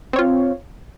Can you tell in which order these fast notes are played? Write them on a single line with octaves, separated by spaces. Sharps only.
C4 C#5 F4